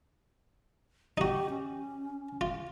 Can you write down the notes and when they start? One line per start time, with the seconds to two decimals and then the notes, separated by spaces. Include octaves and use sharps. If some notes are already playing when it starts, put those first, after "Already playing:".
1.18 D#4 F#4 G4
1.49 C#4
2.41 F4